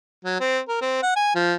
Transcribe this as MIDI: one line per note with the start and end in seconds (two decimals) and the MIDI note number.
0.25 0.36 54
0.40 0.59 60
0.68 0.77 70
0.81 0.98 60
1.03 1.13 78
1.16 1.33 80
1.35 1.54 53